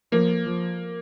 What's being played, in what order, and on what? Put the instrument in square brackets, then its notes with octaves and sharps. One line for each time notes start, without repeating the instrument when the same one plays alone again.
[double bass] F3 [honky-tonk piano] A#3
[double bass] F3